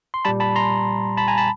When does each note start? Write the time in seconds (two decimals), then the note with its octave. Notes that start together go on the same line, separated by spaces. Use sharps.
0.14 C6
0.25 A#2 G3 A5 B5
0.40 A5 B5
0.56 A#5 C6
1.17 A5 B5
1.28 G#5 A#5
1.38 A5 B5